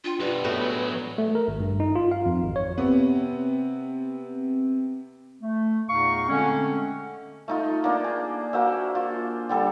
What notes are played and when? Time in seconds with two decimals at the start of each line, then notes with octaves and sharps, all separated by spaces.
0.04 D4 F4 G5
0.20 F#2 B2 G4 B4 D5
0.44 A2 B3 F#4
0.60 F#3 G#3
1.18 A3
1.35 A#4
1.48 G#1
1.60 G2
1.80 D#4
1.96 F4
2.11 F5
2.26 F2
2.42 G#1
2.56 C#5
2.78 C3 B3 C4
5.41 A3
5.88 E2 A#2 D#4 F5 C#6
6.28 D3 G#3 A3 C4 C#4
7.48 A3 D#4 F4
7.84 A#3 D4
8.04 G#4
8.53 A#3 F#4 C5 E5
8.95 F4
9.49 D3 G3 A4